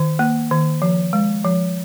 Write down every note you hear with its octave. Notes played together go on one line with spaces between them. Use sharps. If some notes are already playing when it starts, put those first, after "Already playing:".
Already playing: D#3
A#3
D#3
F3
G#3
F3